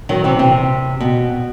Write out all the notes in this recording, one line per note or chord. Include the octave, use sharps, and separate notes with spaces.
D#3 F#3
C3 E3
C3
B2